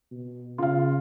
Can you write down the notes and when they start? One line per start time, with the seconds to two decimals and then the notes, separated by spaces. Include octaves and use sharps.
0.11 B2
0.58 C#3 F4 F5